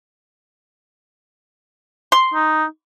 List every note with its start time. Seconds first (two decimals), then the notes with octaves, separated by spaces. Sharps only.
2.12 C6
2.34 D#4